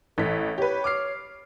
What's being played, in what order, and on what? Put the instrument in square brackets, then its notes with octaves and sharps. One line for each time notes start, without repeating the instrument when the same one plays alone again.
[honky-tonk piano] A1 B6 [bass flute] A4
[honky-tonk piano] G4 B4 [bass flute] C#5
[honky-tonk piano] D6 F6 C7